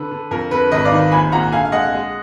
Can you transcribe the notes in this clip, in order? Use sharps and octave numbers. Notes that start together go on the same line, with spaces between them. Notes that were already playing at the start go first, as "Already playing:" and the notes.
Already playing: D3 B4
D3
F2 A#4
D3 B4
G#1 B4 D#5
D5 F5
D#3
A#1 G#5 B5
A#2 F#5 A#5
D3 F5 G#5
F5
G#3 D#5 F#5
G#3